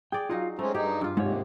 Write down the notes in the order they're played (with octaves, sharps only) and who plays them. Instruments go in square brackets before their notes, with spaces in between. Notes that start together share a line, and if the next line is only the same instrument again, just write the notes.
[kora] G#4 D5 [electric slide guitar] G5
[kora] F#3 D#4 F#5 [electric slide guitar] F4 F5
[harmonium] G#3 C4 C#4 [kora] A3 [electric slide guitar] A#5
[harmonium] G2 D#4 [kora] G4 G#4
[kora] G2 F4
[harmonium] D#2 C3 [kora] G#2 [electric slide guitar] G#3 C#5